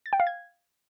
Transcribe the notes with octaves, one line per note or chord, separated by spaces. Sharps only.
A6
G5
F5
G#6